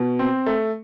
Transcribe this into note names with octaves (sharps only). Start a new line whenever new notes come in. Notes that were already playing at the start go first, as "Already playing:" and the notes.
Already playing: B2
C4
A3